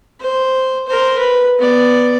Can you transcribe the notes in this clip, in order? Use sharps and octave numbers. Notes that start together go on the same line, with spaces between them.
C5
A#4 C5
B4
B3 D5